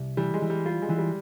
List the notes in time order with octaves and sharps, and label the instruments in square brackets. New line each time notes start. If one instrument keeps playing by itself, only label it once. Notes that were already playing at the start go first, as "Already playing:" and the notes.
Already playing: [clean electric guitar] C2
[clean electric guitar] E3 [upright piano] G3
[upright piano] G#3
[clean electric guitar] E3
[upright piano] G3
[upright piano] G3 [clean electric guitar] F4
[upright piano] G#3
[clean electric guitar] E3
[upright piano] G3